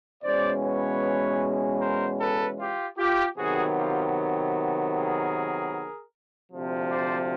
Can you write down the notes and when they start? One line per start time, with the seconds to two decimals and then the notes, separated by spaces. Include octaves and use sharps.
0.23 E2 B2 G#3 C#4 C5 D5
0.62 B4 C#5
1.80 A#4 C5
2.20 A4 B4
2.58 F4 G4
2.98 F4 G4
3.37 C3 D#3 F#3 B3 F#4 G#4
3.77 F4 G4
4.94 G#4 A#4
6.51 D2 C3 F3
6.90 C5 D5